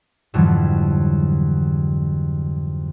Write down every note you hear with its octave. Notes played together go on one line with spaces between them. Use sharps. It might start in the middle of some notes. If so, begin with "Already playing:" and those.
F2 G#2 D3 E3 F#3 G3